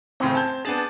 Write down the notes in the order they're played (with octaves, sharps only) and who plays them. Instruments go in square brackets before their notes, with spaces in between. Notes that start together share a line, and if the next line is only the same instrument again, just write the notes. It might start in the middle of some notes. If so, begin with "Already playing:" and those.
[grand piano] D#1 A2 C#3 [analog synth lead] C4
[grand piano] A5 G6 G#6
[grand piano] B3 D4 G#4 [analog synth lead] A5